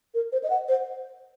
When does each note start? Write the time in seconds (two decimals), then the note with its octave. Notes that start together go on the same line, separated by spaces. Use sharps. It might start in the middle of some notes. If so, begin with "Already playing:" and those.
0.14 A#4
0.32 C5
0.43 D#5
0.50 F#5
0.68 C5